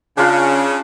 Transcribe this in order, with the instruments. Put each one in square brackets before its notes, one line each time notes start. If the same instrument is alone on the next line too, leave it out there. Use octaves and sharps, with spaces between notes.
[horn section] C#3 [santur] D4 F4 B5